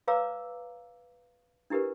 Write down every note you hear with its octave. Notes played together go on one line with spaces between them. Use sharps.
B4 C#5 F5 A#5 D6 E6
D4 E4 G4 A#4 B4